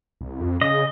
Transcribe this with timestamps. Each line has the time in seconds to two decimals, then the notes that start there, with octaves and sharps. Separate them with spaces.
0.21 C2
0.40 F2
0.61 C#3 D#5